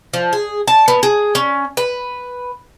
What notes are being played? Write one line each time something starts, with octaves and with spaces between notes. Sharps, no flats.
F3
G#4
A5
B3
G#4
C#4
B4